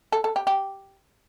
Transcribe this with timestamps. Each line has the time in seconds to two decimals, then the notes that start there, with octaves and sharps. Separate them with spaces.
0.12 A4
0.24 A4
0.36 G4
0.47 G4